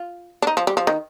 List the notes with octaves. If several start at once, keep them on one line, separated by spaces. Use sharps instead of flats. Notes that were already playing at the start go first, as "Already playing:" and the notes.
Already playing: F4
D4
D#4
F3
G3
F3
D#3